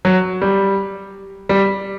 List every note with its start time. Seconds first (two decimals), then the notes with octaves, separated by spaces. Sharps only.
0.05 F#3
0.42 G3
1.49 G3